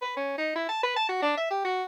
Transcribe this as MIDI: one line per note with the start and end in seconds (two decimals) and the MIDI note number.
0.02 0.15 71
0.17 0.35 61
0.38 0.51 63
0.55 0.66 64
0.69 0.80 81
0.83 0.95 71
0.96 1.07 81
1.09 1.21 66
1.22 1.34 62
1.37 1.48 76
1.51 1.63 67
1.65 1.83 66